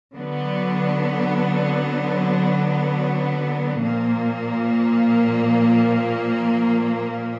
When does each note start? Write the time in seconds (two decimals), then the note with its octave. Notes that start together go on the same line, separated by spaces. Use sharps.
0.17 D3 F#3 B3 D4
3.83 A#2 F3 A#3